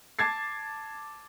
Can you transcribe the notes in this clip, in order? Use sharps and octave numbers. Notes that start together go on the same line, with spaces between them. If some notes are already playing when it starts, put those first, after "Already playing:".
A5 D6 G#6 A6 C7